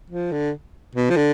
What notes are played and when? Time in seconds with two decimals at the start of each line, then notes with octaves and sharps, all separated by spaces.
0.10 F3
0.32 D3
0.95 B2
1.10 F3
1.16 D3